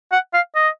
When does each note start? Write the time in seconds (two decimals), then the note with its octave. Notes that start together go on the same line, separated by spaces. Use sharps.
0.12 F#5
0.34 F5
0.55 D#5